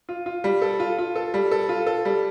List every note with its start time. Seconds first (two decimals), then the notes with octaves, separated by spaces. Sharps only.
0.09 F4
0.26 F4
0.44 G3
0.62 A4
0.80 F4
0.98 F4
1.16 A4
1.34 G3
1.51 A4
1.69 F4
1.86 A4
2.05 G3